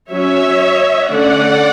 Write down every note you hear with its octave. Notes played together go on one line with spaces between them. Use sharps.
F#3 C#4 C#5 E5
D3 A3 C#4 D5 F#5